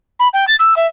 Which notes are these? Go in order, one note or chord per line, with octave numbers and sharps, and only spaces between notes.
B5
G5
A6
E6
E5